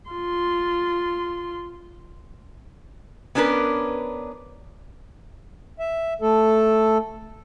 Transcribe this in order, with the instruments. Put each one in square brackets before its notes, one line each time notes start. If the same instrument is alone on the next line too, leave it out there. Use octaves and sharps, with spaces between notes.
[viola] F4 C6
[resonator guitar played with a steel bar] B3 C#4 D4 A#4 B4
[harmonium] E5
A3 A4